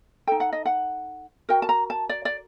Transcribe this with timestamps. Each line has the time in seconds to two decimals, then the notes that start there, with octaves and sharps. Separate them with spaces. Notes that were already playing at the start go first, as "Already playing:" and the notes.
0.27 D#4 A4 G5
0.40 F#5
0.52 D#5
0.66 F#5
1.49 F#4 A#4 G5
1.62 A5
1.69 A#5
1.90 A5
2.09 D5
2.25 D5